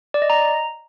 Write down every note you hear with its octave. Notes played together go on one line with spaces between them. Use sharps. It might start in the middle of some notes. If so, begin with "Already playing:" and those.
D5
D#5
A#5